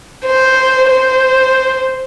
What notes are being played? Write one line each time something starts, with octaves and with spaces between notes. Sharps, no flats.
C5
C5